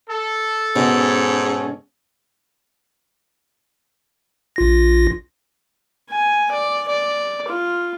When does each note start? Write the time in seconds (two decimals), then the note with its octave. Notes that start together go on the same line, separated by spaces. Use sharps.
0.10 A4
0.76 G#2 B2 C#4
4.56 A#1 F4 A#6
6.11 G#5
6.52 D5
6.89 D5
7.48 F4